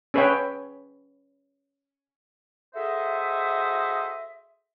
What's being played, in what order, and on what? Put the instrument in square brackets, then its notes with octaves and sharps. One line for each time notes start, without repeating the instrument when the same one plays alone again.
[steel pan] C#4 G#4 B4 C#5 E5 G5
[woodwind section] F#4 G#4 A4 C5 D#5 E5